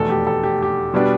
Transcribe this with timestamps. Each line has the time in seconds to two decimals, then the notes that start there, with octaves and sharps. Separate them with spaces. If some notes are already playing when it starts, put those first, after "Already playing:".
Already playing: F1 E2 B2 A3 A4
0.10 G4
0.27 A4
0.43 G4
0.62 G4
0.94 B2 G3 B3 D4